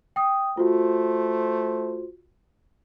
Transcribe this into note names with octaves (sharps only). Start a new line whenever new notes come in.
G5 D#6
A3 F4 F#4 C5